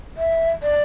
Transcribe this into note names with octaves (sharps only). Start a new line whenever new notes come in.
E5
D5